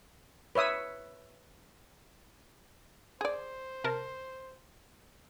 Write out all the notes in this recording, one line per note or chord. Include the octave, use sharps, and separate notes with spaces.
B4 C#5 E5 D#6
G#4 C5 D5
C3 A#4 A5